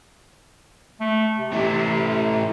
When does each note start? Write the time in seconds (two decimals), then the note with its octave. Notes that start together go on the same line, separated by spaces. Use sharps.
1.00 A3
1.38 C3
1.53 C3 E3 A3